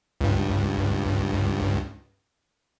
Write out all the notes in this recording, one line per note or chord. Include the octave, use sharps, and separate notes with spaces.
C#2 G2